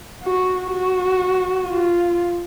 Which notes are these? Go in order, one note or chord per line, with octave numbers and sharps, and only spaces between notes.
F#4
F#4
F4